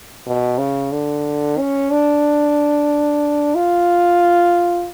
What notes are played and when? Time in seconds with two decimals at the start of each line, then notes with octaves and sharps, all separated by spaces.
0.27 B2
0.58 C#3
0.92 D3
1.58 C#4
1.91 D4
3.55 F4